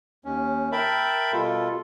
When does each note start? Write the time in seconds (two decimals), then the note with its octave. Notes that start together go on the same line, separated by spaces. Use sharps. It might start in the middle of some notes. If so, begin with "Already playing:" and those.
0.25 D#2 C#4
0.72 A#4 E5 G5 A5 B5
1.33 B2 G3 F4 A4